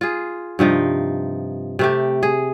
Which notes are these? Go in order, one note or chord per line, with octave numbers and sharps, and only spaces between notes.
F4 G#4
G2 C3 F3 D#4
C3 A3 G4
G#4